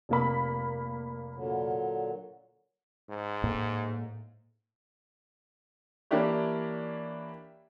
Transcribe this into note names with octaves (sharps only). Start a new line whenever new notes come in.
F1 A#3 B5
A#2 D3 F#3
G#2
A2 A#3
E3 A#3 D4 E4 G4 C#5